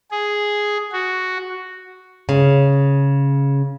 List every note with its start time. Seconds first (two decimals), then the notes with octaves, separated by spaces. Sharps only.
0.11 G#4
0.92 F#4
2.29 C#3